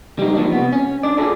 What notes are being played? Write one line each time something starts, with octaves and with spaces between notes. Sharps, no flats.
G3 D#4
F3 A#3 D4
C3 B3
C#4
D4 D5
F4 F#4 G#4 A4 D5